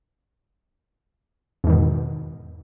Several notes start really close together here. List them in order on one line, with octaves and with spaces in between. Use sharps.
E2 G#2 D#3 B2